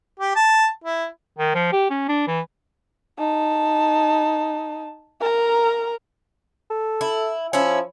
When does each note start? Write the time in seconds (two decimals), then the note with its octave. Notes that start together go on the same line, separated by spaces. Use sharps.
0.20 G4
0.36 A5
0.84 E4
1.38 D#3
1.55 F3
1.72 G4
1.90 C#4
2.09 D4
2.27 E3
3.19 D#4 A5
5.21 A#4 A#5
6.70 A4
7.01 E4
7.53 F3 C#4 E4